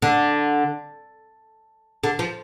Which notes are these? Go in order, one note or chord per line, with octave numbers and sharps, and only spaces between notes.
D3
D3
F3